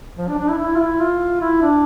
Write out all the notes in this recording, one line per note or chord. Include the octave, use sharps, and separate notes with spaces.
F3
D4
D4
E4
E4
F4
E4
F4
E4
D4